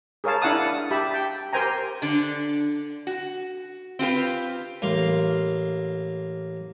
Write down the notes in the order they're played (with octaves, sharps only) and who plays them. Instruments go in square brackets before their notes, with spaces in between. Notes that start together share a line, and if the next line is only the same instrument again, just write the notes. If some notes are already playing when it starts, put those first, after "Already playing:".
[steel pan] G#4 A#4 C#5 F5 A5
D4 E4 F5 F#5 A5 D#6
G4 E5 A5 B5
G5
G4 A#4 C5 G5 G#5 A#5
[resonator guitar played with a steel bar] D3 D4
F#4
C4 F4 G4 B4
[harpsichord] A1 A#3 F5 C6